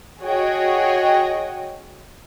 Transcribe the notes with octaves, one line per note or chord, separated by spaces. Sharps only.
F#4 G#4 C#5 D#5 G5